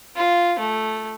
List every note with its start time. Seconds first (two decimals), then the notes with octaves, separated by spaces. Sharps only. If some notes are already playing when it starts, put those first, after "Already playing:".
0.16 F4
0.59 A3